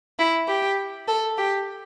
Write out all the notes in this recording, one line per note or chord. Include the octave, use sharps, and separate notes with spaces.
E4
G4
A4
G4